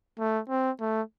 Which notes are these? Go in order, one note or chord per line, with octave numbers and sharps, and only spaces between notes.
A3
C4
A3